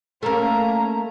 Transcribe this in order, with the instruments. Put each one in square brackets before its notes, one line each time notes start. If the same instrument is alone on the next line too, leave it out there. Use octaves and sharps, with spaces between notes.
[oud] A3 A#3 [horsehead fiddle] C#4 A#5